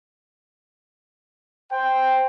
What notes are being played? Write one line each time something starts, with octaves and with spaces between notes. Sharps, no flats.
C5 G5